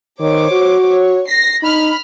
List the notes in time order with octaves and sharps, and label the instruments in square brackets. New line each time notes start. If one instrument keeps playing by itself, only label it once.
[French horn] D#3 [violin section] C5 C#5 D6
[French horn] F#4
[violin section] C#5
A#6 C7
[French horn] D#4 [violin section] B5 F6